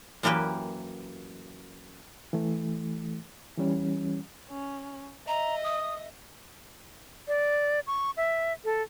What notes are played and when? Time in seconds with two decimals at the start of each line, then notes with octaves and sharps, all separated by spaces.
0.23 F#2 E3 A#3 G4 B4 G5
2.33 E3 A3
3.58 E3 G3 C#4
4.50 C#4
5.28 D#5 E5 A#5
5.64 D#6
7.28 D5
7.87 C#6
8.17 E5
8.65 A4